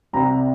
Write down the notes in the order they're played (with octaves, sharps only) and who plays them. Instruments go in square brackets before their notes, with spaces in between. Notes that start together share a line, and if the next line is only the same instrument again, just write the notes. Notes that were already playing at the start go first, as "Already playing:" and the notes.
[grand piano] C2 C3 G3 A#5